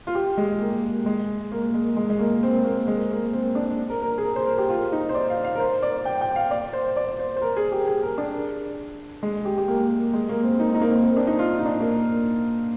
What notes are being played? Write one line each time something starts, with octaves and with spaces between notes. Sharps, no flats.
F4
G4
G#3
A#3
G#3
A#3
G#3
G#3
G#3
A#3
C4
A#3
G#3
A#3
C4
D4
A#4
A#4
G#4
A#4
C5
A#4
G4
F4
D#4
C5
D5
F5
F5
A#4
C5
D5
G5
G5
F5
D5
C5
D5
C5
C5
A#4
G#4
G4
G#4
A#4
D4
G#3
G4
G4
A#3
G#3
A#3
C4
D#4
D#4
A#3
C4
C4
D4
D#4
F4
D#4
D4
A#3